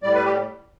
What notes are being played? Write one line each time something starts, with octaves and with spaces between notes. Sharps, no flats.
A2 G3 D5
B4
G4